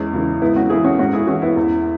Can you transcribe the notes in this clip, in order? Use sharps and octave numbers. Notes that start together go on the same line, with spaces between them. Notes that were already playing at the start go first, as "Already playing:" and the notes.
Already playing: E2 G#3 C#4
C#3 E3
G#2 B3 E4
C#4 F#4
E3 E4 G#4
C#4 F#4
G#2 C#4 F#4
E4 G#4
E3 C#4 F#4
B3 E4
E2